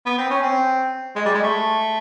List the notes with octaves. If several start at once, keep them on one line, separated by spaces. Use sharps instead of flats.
B3
C4
C#4
C4
G#3
G3
G#3
A3